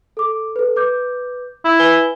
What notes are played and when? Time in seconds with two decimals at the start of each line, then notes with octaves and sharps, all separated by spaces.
0.17 A4 D6
0.56 A4 B4
0.76 B4 D6 G6
1.65 E4
1.79 B4 G#5 G7